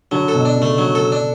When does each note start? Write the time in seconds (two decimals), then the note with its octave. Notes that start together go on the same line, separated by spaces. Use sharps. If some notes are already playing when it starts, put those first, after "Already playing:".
0.11 D3 F#3
0.28 A4
0.34 B2
0.45 D4
0.57 C#3
0.62 A3
0.78 D3 F#3
0.95 A4
1.12 D4